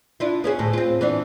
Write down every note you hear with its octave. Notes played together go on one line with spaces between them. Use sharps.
D4 E4 F4
B3 C#4 G#4
D2 A2
C4 F4
E3 B3 D4